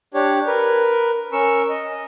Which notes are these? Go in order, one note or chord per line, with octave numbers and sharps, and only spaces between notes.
D4 G4 C#5
A#4 B4
C#4 A#4 C#6 E6
D#5